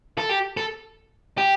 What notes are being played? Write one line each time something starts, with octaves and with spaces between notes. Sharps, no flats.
A4
G4
A4
G4